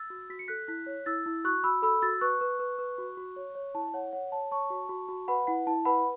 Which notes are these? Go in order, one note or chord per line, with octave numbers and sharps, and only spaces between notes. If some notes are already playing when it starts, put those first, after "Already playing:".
Already playing: E6 A6
F#4
F#4 B6
C#7
A4 F#6 B6
E4 F#6 B6
C#5
E4 E6 A6
E4
F#4 C#6 F#6
F#4 B5 E6
A4 B5 E6
F#4 E6 A6
B4 C#6 F#6
B4
B4
B4
F#4
F#4
C#5
C#5
E4 A5
C#5 F#5
C#5 F#5
C#5 A5
C#5 A5 C#6
F#4
F#4
F#4
B4 F#5 B5
E4 F#5
E4 A5
B4 F#5 B5